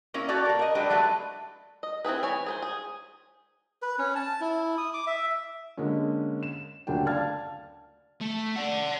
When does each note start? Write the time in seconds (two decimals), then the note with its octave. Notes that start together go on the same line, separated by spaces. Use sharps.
0.14 A#3 C#4 E4 A#4 C#5
0.28 F#4 G4 A4 C#5 D5
0.45 A#3 A#4
0.59 A#4 D#5
0.75 F#3 G#3 D4 G4 B4
0.90 F#3 G#3 A3 A4 B4
1.83 D#5
2.05 C4 E4 G#4 B4
2.23 E3 C#5 G#5
2.46 G#4 B4 C5
2.62 G#4
3.82 B4
3.99 C#4
4.16 A5
4.41 E4
4.78 D#6
4.94 D6
5.07 E5
5.77 D3 G#3 A#3 C#4
6.43 E7
6.87 D2 C#3 F#3 A#3 D4 G5
7.07 D5 F5 A5 F6 G#6 A6
8.21 A3
8.56 D5 F#5